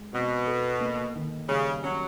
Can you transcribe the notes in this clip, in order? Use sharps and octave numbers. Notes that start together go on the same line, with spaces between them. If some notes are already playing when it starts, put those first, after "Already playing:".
Already playing: G#3
B2 C4
A4
A#3
D#3
C#3 G3
F#3 C#4